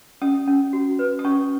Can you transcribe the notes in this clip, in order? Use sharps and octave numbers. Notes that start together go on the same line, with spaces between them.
C#4 D#6
C#4
F#4
B4
D#6
C#4 C#6